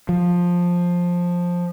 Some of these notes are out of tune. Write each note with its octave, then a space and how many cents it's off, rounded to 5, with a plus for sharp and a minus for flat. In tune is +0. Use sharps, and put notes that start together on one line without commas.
F3 +10